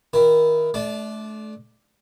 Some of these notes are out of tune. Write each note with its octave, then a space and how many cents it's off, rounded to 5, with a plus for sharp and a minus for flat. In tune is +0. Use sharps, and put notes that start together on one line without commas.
D#3 +20 E4 +10 A#4 +25
A3 -30 D4 +0